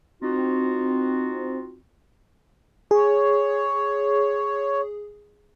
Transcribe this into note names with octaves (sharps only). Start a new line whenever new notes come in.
C4 D#4 F4 F#4
G#4 C#5